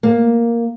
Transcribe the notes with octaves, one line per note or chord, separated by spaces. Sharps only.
A#3